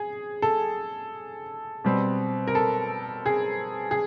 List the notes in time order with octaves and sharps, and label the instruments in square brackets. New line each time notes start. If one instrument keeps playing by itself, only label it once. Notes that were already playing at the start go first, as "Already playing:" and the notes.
Already playing: [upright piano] G#4
A4
B2 G3 C4
A#4
A4
G#4
G#4